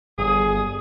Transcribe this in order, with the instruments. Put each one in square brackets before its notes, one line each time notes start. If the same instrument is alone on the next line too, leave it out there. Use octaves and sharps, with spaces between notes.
[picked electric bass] G1 [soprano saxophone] G#4 [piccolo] D#6